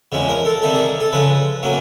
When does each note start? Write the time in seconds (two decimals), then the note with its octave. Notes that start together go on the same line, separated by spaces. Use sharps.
0.12 E2 C#3 F3 G#3
0.29 A#4
0.45 A4
0.62 C3 D#3 G3 A#3 A4
0.74 G#4
1.00 A4
1.12 C#3 F3 G#3 B4
1.63 A2 F#3 A#3 C#4